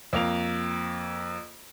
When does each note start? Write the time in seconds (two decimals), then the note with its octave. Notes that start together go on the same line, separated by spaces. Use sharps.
0.13 F2 A#3 F7